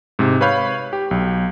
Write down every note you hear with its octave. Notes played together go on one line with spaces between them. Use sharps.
G#2 C3
B4 C#5 F5 B5 G6
G4
B1